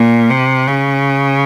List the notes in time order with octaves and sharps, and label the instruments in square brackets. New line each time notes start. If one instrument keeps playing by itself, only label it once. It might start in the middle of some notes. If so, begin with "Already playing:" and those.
Already playing: [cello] A#2
C3
C#3